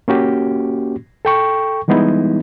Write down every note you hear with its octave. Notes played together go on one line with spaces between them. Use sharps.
A#3 C#4 F#4 G4
A4 G5 C#6
E3 G3 G#3 B3 D#4 E4